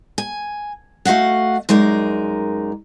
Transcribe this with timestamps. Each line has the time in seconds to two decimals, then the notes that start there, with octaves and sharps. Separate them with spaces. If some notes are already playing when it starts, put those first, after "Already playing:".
0.18 G#5
1.05 A3 F#4 D#5 F5 F#5
1.69 F#2 G#3 D#4 A#4 D5